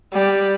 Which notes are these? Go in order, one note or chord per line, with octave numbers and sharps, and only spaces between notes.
G3